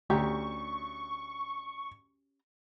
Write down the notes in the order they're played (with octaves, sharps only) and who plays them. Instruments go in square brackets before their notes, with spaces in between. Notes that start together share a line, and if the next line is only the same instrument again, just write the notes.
[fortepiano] D2 [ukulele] C#4 G4 A#5 [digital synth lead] C#6